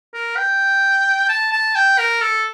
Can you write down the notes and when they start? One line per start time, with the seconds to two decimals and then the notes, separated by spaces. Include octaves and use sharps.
0.14 A#4
0.37 G5
1.29 A5
1.53 A5
1.76 G5
1.99 A#4
2.22 A4